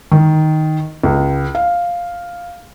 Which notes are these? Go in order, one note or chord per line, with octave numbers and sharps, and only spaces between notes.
D#3
C#2
F5